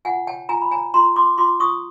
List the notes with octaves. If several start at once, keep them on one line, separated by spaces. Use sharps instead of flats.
F4 F#5 G#5
C#5 G5 A5
F4 G#5 A#5
B5
C#5 G#5 A#5
F4 A#5 C6
F4 C6 D6
F4 C6 D6
F4 C#6 D#6